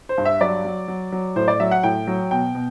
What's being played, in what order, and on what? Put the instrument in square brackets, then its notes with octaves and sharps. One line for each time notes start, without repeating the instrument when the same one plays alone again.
[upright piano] C5
G2
E5
F#3 D5
F#3
F#3
F#3
A2 C5
D5
F#3 E5
F#5
A2 G5
F#3
B2 G5
B2